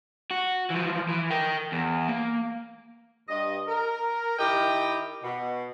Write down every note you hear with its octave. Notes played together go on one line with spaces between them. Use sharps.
F#4
E3 F3
E3
A#4 G5
E2
A#3
G2 D#5
A#4
D#3 E4 G4 D#5 G5
B2